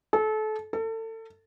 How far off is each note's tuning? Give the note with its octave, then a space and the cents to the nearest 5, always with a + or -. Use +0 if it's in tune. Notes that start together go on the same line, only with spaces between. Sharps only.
A4 -30
A4 +30